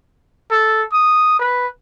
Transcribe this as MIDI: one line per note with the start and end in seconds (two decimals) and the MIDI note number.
0.51 0.84 69
0.92 1.38 87
1.39 1.67 71